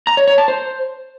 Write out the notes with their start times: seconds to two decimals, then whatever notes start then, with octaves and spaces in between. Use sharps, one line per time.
0.07 A#5
0.17 C#5
0.28 C#5
0.38 A5
0.48 C5